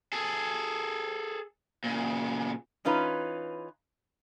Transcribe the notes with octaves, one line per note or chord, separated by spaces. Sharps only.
G#4 A4
A#2 C#3
E3 C#4 D#4 F4 B4